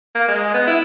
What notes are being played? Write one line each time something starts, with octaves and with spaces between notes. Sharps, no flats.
A#3
G#3
B3
E4